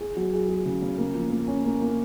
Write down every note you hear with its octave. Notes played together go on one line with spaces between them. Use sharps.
G#4
F#3
G#4
G#4
C#3
C#3
A#3
F3
A#3
C#4
A#3
A#3